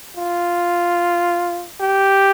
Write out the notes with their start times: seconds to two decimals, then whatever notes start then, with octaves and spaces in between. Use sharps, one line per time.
0.17 F4
1.80 G4